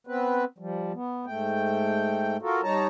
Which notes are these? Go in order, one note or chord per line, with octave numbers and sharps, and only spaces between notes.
B3 C4 B4
F3 G3
B3
G#2 A3 G5
F4 F#4 A4 A#4
G3 D#4 C#5 A5 A#5